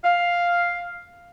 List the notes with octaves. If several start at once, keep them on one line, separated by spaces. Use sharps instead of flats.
F5